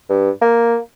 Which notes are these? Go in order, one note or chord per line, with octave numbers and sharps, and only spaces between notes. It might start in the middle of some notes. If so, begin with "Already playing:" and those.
G2
A#3